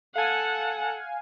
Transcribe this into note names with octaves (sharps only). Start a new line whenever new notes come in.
A4 F5 F#5 G#5